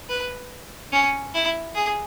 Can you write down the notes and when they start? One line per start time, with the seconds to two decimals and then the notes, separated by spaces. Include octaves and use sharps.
0.09 B4
0.92 C#4
1.34 E4
1.75 G#4